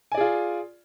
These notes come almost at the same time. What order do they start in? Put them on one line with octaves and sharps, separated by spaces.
G#5 D5 G#4 F4